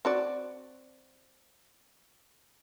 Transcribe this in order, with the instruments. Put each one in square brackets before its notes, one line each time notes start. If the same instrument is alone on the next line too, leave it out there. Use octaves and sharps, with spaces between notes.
[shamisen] C4 F#4 D5